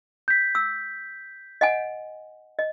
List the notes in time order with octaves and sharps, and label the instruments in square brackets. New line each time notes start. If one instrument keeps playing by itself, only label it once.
[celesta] G6 B6
[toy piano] E6
D#5 F#5 G#5
D#5